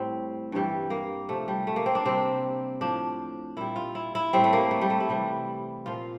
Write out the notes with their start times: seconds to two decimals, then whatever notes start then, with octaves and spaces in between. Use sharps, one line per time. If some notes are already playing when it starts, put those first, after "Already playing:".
Already playing: A2 G3 C4
0.52 G2 E3 G3
0.90 A#3
1.29 C3 F3 A3
1.48 G3
1.67 A3
1.76 A#3
1.86 C4
1.95 D4
2.05 C3 G3 C4
2.81 A2 F3 D4
3.57 A#2 G3 E4
3.76 F4
3.95 E4
4.15 E4
4.33 A2 G3 C4
4.44 A3
4.53 A#3
4.71 A3
4.81 G3
4.90 A3
5.00 E4
5.09 C3 E3 G3
5.86 A#2 F3 F4